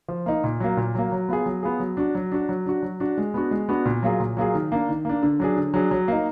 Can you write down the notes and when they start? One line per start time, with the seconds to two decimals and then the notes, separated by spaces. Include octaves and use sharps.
0.08 F3
0.26 A#3 D#4
0.44 A#2
0.60 F#3 A#3
0.77 A#2
0.95 F#3 A#3
1.12 F#3
1.29 B3 F4 G#4
1.46 F#3
1.63 B3 F4 G#4
1.80 F#3
1.97 D4 F#4
2.15 F#3
2.32 D4 F#4
2.49 F#3
2.66 D4 F#4
2.83 F#3
3.00 D4 F#4
3.18 G#3
3.34 B3 D4 F#4
3.51 G#3
3.69 B3 D4 F#4
3.85 A#2
4.03 F#3 A#3 F4 G#4
4.20 A#2
4.37 F#3 A#3 F4 G#4
4.54 D#3
4.72 A#3 D4
4.89 D#3
5.05 A#3 D4
5.23 D3
5.40 F#3 D4 G#4
5.56 D3
5.74 F#3 D4 G#4
5.91 F#3
6.08 A#3 D#4